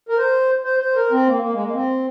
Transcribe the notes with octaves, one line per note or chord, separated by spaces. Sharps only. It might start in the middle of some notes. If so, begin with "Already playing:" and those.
A#4
C5
C5
C5
A#4
C4
A#3
A#3
G#3
A#3
C4